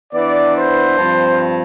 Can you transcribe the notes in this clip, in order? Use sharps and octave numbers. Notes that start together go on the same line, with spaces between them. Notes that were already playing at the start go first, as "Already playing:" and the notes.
E3 B3 D4 D5
C5
G2 F3 C4